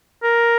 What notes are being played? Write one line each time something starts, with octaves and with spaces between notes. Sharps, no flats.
A#4